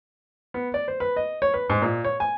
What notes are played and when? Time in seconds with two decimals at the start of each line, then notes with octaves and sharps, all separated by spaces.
0.54 B3
0.74 D5
0.88 C5
1.00 B4
1.17 D#5
1.42 C#5
1.54 B4
1.70 G#2
1.82 A#2
2.04 C#5
2.20 G#5